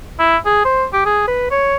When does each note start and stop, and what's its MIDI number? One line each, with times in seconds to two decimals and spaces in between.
0.19 0.37 64
0.45 0.64 68
0.65 0.85 72
0.93 1.03 67
1.05 1.24 68
1.28 1.46 71
1.51 1.77 73